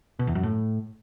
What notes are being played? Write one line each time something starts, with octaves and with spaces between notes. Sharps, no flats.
B2
E2
F#2
A2